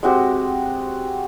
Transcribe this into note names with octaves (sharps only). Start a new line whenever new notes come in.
G#3 C4 F#4 G4